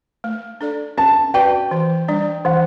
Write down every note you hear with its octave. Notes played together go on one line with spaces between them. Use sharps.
A3
D4 A4 D5
C#4 A5
F#4 B4 D5 G5
E3
G3 D4
E3 F#5